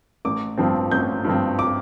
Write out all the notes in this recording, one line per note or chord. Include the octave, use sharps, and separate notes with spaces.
A1 D6
G2 F3 C4
A1 G6
G2 F3 C4
D6